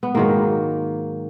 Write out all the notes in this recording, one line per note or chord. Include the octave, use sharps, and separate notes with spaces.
B3
G#2 D#3 F#3 A#3